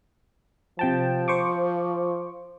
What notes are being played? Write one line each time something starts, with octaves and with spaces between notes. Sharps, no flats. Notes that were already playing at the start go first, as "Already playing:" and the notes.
C3 F3 G5 A5
C5 C#6 D6